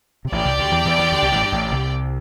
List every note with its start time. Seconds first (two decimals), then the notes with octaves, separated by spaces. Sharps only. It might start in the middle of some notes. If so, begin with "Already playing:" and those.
0.25 C3
0.32 A1 A2 G4 D5 G5
0.45 C2 C3
0.58 D2 D3
0.71 E2 E3
0.85 E2 E3
0.98 E2 E3
1.12 D2 D3
1.22 C2 C3
1.32 A1 A2
1.42 G2
1.52 A1 A2
1.72 C2 C3